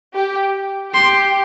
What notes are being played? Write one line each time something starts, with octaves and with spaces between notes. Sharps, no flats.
G4
G4 C6